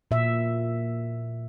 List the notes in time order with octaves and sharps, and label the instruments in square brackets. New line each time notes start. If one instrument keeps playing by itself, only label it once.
[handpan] A#2 E5